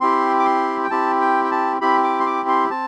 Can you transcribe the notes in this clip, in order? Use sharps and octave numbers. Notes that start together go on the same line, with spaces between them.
C4 E4 G4 C6
D6
C6
G5
C4 E4 G4 A5
G5
G5
A5
C4 E4 G4 B5
D6
C6
D6
C6
C4 A5